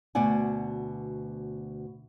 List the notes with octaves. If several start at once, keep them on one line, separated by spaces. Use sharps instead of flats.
D2 B2 D5 F#5 G#5